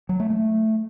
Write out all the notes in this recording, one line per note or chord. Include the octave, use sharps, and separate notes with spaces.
F#3
A3
A3